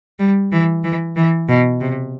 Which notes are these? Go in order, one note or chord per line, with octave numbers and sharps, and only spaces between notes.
G3
E3
E3
E3
B2
C3